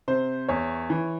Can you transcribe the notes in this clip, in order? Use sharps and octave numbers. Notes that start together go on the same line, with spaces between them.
C3 C5
E2 C#5
E3